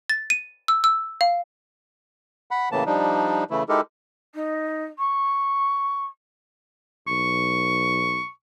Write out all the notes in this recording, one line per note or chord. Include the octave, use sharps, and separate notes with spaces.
A6
D#7
E6
E6
F5
F#5 B5
A2 C#3 E3 A#3 A5
F3 G3 D4 D#4
C#3 E3 A3 E4
G#3 D#4 E4 G4 A4 A#4
D#4
C#6
B1 C#6